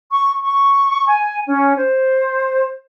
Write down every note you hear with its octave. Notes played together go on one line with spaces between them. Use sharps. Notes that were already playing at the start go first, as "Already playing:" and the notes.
C#6
C#6
G#5
C#4
C5